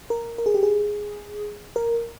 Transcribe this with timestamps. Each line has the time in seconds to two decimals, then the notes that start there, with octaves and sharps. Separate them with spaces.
0.10 A#4
0.38 A#4
0.46 G#4
0.54 G4
0.63 G#4
1.76 A#4